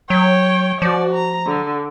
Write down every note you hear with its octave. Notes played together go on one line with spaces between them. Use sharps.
F#3 C#5 G5
F3 F#4 D5
A#5
D3